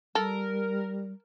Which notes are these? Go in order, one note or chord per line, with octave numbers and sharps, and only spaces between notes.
G3 A4 A#4